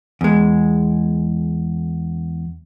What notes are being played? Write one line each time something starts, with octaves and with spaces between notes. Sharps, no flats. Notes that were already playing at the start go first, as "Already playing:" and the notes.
E2 G#3